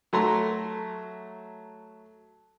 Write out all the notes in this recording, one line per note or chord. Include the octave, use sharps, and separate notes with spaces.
F#3 A3 A#5 C6